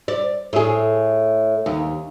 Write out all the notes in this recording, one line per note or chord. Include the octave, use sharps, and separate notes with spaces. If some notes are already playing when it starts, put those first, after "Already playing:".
D5
A2 G#4
D#2